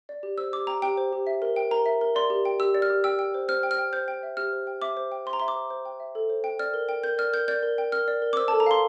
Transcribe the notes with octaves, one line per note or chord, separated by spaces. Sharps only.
D5
G4
C5 E6
G4 D6
G5 A#5
G4 G5
C5
G4
E5
A#4
G5
A#4 A#5
E5
A#4
D5 C6
G4
G5
G4 E6
D5
F6
G4
G5 E6
G5
C5
C5 F6
G5
F6
G5
C5 G6
G5
E5
G4 F6
C5
G5
E5 D6
C5
G5
C5 C6
A#5
E5 C6
D6
C5
C5
G5
E5
A4
C5
G5
D5 F6
A#4
G5
A#4 G6
D5 F6
A#4 G6
D5 G6
A#4
G5
A#4 F6
D5
A#4
D6
C5 E6
A4 A5
A#5
F5 C6